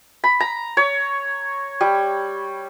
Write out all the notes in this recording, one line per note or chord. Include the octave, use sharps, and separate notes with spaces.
B5
A#5
C#5
G3